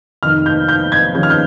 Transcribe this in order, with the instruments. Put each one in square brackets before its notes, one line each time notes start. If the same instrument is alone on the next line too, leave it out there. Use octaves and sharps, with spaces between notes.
[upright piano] F1 F2 D#3 F6
G6
G6
G#6
D#2 C#3 F3 G6
F6
G6